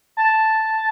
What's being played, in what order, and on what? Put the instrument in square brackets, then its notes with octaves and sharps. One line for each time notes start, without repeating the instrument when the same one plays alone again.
[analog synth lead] A5